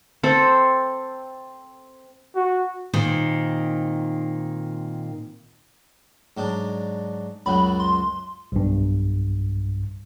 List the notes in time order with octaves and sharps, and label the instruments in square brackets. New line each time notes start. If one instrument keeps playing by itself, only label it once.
[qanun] C4 A4
[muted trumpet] F#4
[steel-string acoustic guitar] A#2 D#3 C4
[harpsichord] G#2 F#3 D4
[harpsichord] C#2 F#2 F#3 [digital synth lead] B5
[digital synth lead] C6
[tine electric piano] B1 G2